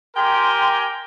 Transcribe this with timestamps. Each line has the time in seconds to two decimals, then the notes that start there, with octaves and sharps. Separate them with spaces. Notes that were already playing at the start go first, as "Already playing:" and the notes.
0.16 G4 A#4 G5 G#5 C6